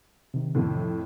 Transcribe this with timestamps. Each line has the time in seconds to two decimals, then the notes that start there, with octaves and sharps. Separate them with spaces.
0.34 C3 D#3
0.55 F2 A2